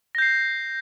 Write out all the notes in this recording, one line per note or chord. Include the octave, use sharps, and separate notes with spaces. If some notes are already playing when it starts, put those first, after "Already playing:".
G6 A#6 C7